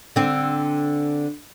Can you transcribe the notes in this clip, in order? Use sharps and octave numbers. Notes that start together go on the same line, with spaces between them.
D3 C4